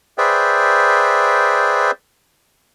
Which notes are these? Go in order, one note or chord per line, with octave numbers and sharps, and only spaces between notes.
G#4 B4 C5 D5 E5 G5